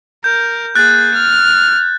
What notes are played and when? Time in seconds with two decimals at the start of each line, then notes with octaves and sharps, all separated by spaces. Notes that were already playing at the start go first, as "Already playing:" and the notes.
0.24 A#4 G6
0.76 A#3 G#4 F#6 A6
1.14 F6